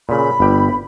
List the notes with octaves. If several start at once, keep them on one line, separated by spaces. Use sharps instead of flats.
A#2 C#3 B5
G1 G4